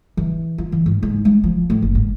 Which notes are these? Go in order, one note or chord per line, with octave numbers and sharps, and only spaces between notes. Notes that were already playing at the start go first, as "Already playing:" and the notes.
E3
F4
E3
G#2
G#2
G#3
F3
A2
F#1
G#2